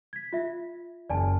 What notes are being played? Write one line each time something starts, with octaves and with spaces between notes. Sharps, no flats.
G#6 B6
F4 E5
F#1 D5 G#5 A5